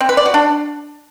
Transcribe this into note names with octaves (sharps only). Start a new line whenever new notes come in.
C4
B4
D5
F#4
D4